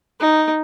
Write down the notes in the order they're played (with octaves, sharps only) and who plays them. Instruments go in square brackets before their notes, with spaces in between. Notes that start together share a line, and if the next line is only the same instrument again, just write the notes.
[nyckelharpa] D#4